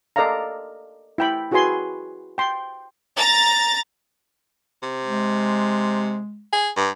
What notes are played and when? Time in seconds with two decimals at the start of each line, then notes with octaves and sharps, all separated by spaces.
0.16 A4 A#4 D5 D#5 F5 A#5
1.18 E4 G5 B5
1.51 E4 F#4 G#4 B4 G#5 C6
2.38 G5 C6
3.16 A#5 A6
4.83 C3
5.04 G#3
6.53 G#4
6.76 G2